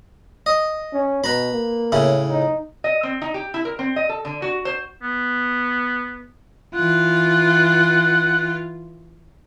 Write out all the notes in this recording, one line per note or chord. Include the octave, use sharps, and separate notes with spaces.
D#5
C#4
B2 B4 A#5 B5
A#3
A2 C#3 E4
D#4
D#5
C4
D#4
G4
E4
A#4
C4
D#5
A4
D3
F#4
C5
B3
E3 F4 F#5